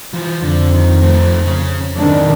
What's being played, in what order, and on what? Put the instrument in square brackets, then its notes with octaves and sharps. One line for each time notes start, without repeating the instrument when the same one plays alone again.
[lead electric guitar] E3 F3
[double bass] F2 [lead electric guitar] D3
[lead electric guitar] D#3
A3 C4
C#3 C#4
[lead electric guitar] F2 G#2 [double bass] D#3 D4